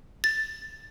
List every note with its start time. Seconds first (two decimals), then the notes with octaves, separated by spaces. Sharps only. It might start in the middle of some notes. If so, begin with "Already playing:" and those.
0.24 A6